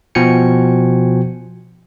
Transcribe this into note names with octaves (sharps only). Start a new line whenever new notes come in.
B2 F3 F#4 G5 G#5 C#7